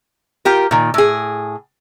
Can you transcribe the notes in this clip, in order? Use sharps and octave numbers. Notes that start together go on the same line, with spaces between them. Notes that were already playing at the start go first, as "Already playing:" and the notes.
F4 G4 A#4
A#2 D#3
A2 G#4